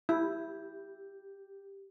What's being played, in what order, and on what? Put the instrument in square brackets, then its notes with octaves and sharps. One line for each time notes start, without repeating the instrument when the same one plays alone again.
[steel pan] E4 [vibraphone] G4